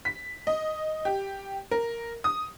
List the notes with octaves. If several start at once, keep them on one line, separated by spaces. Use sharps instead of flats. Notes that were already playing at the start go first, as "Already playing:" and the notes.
B6
D#5
G4
A#4
D#6